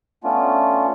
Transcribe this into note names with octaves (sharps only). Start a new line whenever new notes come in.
A3 B3 C#4 D4 F4